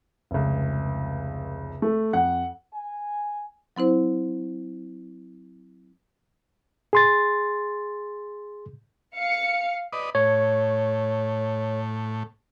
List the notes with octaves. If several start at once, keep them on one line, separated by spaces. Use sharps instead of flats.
F1 C#2
A3
F2 F#5
G#5
F#3 C4 E4 C5
G#4 C6 A6
F5 C#7
B4 D5 D#5
A2 C#5